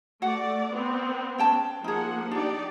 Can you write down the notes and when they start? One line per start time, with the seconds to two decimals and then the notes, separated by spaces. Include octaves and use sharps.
0.22 A3 F#4 D5 F#5
0.72 B3 C4
1.38 C#4 G5 A5
1.84 F3 A#3 D#4 G#4 F#5
2.31 D4 D#4 G4 D5